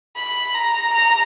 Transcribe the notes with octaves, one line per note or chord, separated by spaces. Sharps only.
B5
A#5
A#5